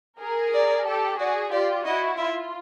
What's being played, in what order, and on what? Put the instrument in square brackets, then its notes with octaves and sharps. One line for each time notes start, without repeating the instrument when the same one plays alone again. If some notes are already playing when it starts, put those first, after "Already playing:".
[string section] G#4 A#4
[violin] D5
[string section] G4 A4
[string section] F#4 G#4 [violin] D5
[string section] F4 G4 [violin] D5
[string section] E4 F#4 [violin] D#5
[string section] F4 [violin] E5